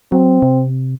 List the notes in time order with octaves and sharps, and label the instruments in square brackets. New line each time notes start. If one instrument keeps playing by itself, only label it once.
[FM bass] F#3 [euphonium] C4
[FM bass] C3